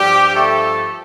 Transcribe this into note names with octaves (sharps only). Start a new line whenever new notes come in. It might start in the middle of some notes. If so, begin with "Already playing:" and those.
Already playing: G2 F3 G3 G4
A3 A4